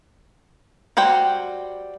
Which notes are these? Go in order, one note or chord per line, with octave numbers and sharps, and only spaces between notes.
G3 F#4 C5 G5